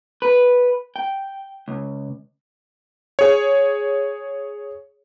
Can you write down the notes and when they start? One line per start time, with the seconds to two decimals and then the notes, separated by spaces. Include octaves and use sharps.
0.22 B4
0.96 G5
1.68 C#2
3.19 G#4 C#5